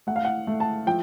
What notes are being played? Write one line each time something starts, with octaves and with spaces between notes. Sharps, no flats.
A3 F#5
F5
F#5
A3
A5
F3 G5